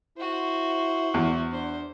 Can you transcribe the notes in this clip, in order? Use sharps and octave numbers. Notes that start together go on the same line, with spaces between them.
E4 F#4 C5
E2
D4 C5